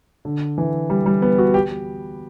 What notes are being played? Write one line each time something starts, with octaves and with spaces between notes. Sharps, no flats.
D3
E3
G3
G3
B3
F#4
G4